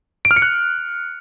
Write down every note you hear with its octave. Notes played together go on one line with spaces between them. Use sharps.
D7
F6
C#7
F#6